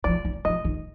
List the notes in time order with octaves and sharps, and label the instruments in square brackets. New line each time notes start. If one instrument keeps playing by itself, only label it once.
[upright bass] F3 [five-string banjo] D5
[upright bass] E3
[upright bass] F3 [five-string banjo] D#5
[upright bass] D#3